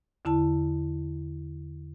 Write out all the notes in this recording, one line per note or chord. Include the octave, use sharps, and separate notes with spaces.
E2 D3 E4 A5